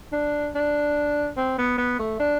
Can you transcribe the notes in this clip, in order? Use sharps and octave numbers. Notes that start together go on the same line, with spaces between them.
D4
D4
C4
B3
B3
A3
D4